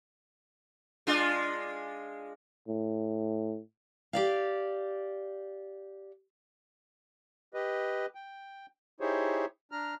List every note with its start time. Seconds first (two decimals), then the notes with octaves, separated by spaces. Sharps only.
1.07 G#3 D4 F4
2.68 A2
4.13 G4 D5 F5
7.54 G4 B4 D#5
8.15 G5
9.00 D#4 E4 G4 G#4 C5 C#5
9.72 D4 A#5 F6